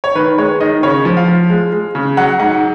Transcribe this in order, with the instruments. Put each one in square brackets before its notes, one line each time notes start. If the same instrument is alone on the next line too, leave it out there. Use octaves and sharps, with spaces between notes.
[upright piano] C#5
D#3 B4
G#3 C#5
D#3 D#5
C#3 C#5
F3
F5
F3
G#3
G#3
C#3
F#3 F#5
G#2 F#5